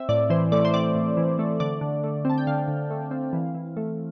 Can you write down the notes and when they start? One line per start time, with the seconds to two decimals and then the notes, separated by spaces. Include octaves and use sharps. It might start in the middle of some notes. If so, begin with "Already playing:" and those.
Already playing: C4 E5
0.09 A2 D5
0.30 E3 C5
0.52 A3 D5
0.65 C5
0.74 C4 D5
0.95 A2
1.17 E3
1.39 A3
1.60 D3 D5
1.81 D3
2.04 A3
2.25 C4 A5
2.38 G5
2.47 D3 F5
2.68 D3
2.90 A3
3.11 C4
3.33 E3
3.54 E3
3.77 A3